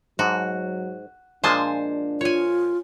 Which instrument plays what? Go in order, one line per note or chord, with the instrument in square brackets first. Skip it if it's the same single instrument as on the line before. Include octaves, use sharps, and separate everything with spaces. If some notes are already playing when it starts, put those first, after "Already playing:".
[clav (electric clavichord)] G#2 A5 [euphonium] F#3 [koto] F#4
[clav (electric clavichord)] A#2 F3 G#3 [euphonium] D4 [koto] C5 G#5 A5
[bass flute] F4 [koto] C#5 G#5